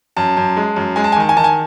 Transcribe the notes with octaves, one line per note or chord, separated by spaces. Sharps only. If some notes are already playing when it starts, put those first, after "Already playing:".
F#2 A5
F#2
G#3
F#2
G#3 G#5
A5
G#5
D#3 A5
G#5
D#3 A5
G#5